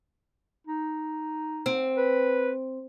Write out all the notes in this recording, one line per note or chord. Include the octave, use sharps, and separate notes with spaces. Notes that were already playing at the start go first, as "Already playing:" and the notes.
D#4
C4
B4